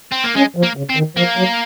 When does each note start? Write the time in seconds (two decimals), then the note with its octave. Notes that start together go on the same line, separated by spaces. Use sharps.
0.12 C4
0.24 A#3
0.36 G#3 C#4
0.57 F3
0.63 A#3
0.77 C#3
0.90 C4
0.97 D#3
1.17 F3 A#3
1.38 F#3